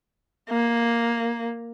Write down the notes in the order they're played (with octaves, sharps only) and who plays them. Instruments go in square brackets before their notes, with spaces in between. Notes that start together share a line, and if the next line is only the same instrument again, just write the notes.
[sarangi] A#3